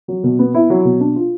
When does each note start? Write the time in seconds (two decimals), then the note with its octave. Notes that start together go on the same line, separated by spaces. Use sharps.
0.08 F#3
0.24 B2
0.39 B3
0.54 E4
0.70 F#3
0.85 B2
1.00 D4
1.16 F4